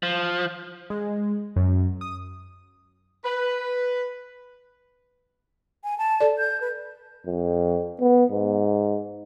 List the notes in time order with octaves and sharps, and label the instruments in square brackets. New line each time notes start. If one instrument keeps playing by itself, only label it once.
[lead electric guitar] F3
[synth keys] G#3
F#2
D#6
[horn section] B4
[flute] G#5
A5
[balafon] A4 D5
[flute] G6
B4
[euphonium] F2
B3
G#2